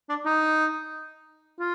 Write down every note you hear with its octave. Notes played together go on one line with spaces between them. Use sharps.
D4
D#4
F4